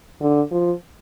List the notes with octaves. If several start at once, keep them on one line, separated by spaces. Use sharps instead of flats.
D3
F3